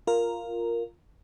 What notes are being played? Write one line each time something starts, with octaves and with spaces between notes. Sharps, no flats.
F4 A#4